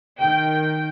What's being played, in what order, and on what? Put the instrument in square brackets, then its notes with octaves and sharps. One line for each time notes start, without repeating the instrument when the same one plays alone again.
[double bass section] D#3 [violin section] G5